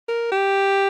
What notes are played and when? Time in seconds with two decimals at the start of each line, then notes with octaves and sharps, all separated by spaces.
0.08 A#4
0.32 G4